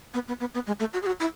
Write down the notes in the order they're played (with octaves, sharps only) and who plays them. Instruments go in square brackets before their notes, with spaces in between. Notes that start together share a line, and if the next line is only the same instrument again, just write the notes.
[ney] B3
B3
B3
B3
G#3
A3
F#4
G#4
F#4
E4